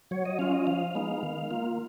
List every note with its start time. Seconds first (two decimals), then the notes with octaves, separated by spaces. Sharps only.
0.11 F#3 C#5
0.25 D#5
0.39 C#4 F4 F5
0.53 D#5
0.67 F3 F5
0.95 G#3 B3 D#4
1.23 D#3
1.51 A#3 F4